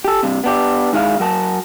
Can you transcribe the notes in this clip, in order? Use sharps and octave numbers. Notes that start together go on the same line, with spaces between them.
G4 A4
G2 C3
B3 D4 G4
G#2 D#3 G#3 E4 B4 F5
F#3 A#4 A5